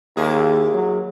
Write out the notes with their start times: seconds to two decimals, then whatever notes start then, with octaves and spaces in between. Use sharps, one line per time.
0.17 D#2 A#3 E4 G#4
0.74 F#3